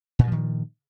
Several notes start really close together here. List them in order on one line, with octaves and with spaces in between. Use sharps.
A#2 G2 F3 D#3